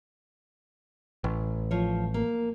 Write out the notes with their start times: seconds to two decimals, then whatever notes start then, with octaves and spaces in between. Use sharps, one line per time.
1.24 A1
1.71 F3 C#5
2.14 A#3